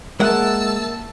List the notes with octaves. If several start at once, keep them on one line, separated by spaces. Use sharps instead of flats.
G#3 A#3 A#4 E5 F#5 A5 E6